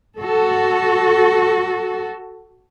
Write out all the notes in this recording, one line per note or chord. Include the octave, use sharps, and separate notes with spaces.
F#4 A4